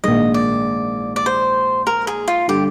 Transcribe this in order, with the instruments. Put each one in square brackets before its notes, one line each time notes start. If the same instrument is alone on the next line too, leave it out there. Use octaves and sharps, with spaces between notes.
[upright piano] A#1 G#2 D#3 G#3 [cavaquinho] D#5
[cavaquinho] D5
D5
C5
A#4
G#4
F4
[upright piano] D3 G3 [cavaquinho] G4